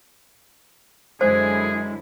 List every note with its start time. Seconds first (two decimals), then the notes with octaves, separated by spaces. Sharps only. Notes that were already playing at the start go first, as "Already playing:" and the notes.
1.21 F#2 D3 G#3 E4 G#4 C5